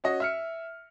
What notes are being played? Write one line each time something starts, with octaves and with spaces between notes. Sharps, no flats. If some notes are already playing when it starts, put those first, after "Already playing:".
C#4 F#4 D#5
E5 F6 C#7